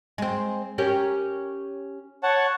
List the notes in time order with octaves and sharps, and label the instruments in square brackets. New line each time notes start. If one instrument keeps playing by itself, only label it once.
[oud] G#3 C4
C#4 G4 A#4
[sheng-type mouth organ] C#5 F#5 A5